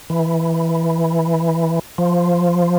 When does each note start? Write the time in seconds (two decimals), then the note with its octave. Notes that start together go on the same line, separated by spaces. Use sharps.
0.10 E3
1.98 F3